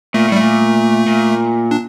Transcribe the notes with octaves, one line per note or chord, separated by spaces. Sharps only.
A#2 A3
A2 G3
A#2 A3
A#2
D4